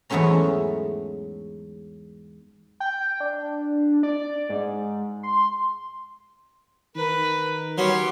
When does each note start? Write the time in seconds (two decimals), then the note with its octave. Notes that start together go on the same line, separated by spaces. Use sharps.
0.10 E2 G#2 F#3 A3 C#4 A#5
2.80 G5
3.20 D4
4.03 D5
4.49 G#2
5.23 C6
6.96 D#3 A#4 B4
7.78 F#3 B3 C#4 G4 C6